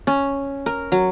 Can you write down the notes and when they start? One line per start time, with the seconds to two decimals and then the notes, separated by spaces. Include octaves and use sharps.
0.07 C#4
0.66 A#4
0.92 F#3